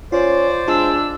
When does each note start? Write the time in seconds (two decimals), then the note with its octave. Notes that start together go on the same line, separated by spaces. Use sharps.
0.12 C#4 F4 C5 D5
0.68 G#3 D4 F4 E6